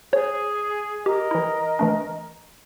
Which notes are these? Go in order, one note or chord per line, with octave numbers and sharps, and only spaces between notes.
G#4 C5 C#5
G4 A#4 D#5
E3 E4
E3 A3 D4